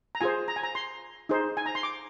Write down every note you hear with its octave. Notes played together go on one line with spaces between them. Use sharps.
A#5
F4 G#4 C5 G#5
A#5
G#5
A#5
C6
D#4 G#4 C5
G#5
A#5
C6
D6